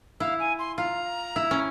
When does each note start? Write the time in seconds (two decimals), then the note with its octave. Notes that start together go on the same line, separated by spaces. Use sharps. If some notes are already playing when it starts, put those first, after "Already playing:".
0.20 E4 F5
0.39 G#5
0.58 C6
0.78 F4 A#5
1.36 E4
1.51 C#4